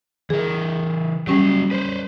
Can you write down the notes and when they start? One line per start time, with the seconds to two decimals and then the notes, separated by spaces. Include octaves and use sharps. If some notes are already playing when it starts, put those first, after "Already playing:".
0.30 E3 G#4 A#4
1.27 F#3 G3 C#4 G4 G#4
1.71 B4 C5